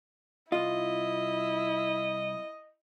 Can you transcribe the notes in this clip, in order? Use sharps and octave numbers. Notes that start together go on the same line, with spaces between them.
C2 E4 F4 D#5